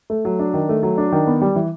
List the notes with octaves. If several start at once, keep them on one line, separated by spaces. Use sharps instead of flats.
A3
F#3
D4
D#3
A3
F#3
D4
D#3
B3
G3
E3